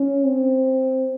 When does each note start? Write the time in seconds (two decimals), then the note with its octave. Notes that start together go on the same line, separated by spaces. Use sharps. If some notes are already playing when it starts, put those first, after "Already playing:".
Already playing: C#4
0.25 C4